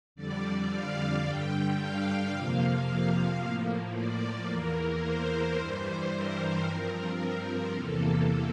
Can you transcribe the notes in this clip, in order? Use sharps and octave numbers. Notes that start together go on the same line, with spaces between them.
F2 D3 G3 D5
F5
G2 D3 G3 G5
F5
F2 C3 F3 A#3 F5
A2 F3 A#3
D5
E2 E3 A#3 A#4
C5
G2 E3 G3 C5
A#4
G2 F3 C4
E2 C3 E3 A#3 A4